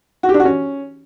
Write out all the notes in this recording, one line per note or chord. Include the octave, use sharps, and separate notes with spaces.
F#4
G4
D4
F#4
C#4